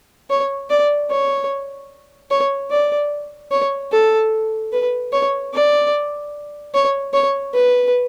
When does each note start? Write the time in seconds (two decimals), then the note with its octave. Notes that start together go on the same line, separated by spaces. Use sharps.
0.30 C#5
0.70 D5
1.10 C#5
2.31 C#5
2.70 D5
3.51 C#5
3.92 A4
4.72 B4
5.13 C#5
5.54 D5
6.74 C#5
7.14 C#5
7.54 B4